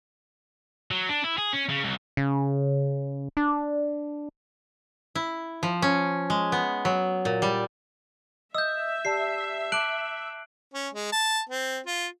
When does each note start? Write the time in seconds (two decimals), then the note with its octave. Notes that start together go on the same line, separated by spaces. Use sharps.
0.91 F#3
1.09 D4
1.24 E4
1.38 G#4
1.53 C#4
1.69 C#3
1.84 C2
2.17 C#3
3.37 D4
5.15 E4
5.63 F3
5.82 C#4
6.30 G#3
6.52 B3
6.85 F#3
7.25 A#2
7.42 G3
8.55 D#5 E5 D#6 E6 G6
9.05 G4 D5 A5 C7
9.72 A5 D6 F#6 D7 F#7
10.74 C#4
10.94 G#3
11.12 A5
11.49 C4
11.86 F4